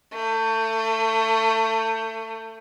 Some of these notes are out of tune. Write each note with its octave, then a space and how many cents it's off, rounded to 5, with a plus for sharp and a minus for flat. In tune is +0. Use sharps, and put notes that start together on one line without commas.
A3 +25